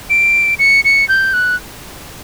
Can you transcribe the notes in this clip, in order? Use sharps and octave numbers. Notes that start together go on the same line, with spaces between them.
D7
C#7
C#7
G6
F#6